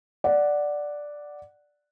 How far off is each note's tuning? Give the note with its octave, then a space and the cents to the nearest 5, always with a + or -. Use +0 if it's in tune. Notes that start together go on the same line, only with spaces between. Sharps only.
D5 +0 F#5 +0